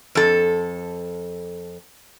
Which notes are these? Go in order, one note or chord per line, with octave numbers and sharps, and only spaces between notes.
F2 A4